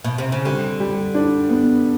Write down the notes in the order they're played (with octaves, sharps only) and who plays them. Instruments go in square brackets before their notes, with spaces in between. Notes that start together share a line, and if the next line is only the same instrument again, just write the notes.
[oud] B2
C3
C#3
[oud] D3 [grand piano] G3
[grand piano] G3
D4
B3